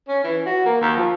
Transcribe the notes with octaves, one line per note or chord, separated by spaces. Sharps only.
C#4
E3
F#4
A#3
D#2
F3